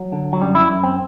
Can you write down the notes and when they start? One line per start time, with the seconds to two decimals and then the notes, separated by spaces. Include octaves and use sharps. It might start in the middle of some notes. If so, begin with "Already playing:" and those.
Already playing: F#3
0.12 D3
0.33 F#3
0.41 F#2 G3
0.55 E4
0.69 F#2
0.83 C4